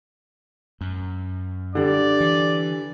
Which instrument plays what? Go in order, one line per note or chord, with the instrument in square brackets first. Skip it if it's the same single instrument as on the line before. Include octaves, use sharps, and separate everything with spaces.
[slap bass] F#2
[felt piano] D3 G3 [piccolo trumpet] D5
[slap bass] E3